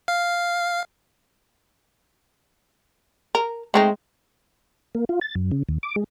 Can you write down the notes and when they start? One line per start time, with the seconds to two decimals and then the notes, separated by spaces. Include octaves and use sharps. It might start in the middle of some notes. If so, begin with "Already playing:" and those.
0.08 F5
3.35 A#4
3.74 G#3 A3 C4 D#4
4.95 A#3
5.09 F4
5.21 A6
5.35 F#2
5.51 C#3
5.69 D#2
5.83 D6
5.96 G#3